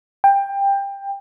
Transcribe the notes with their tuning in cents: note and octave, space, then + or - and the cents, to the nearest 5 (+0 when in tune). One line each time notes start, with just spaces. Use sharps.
G5 +20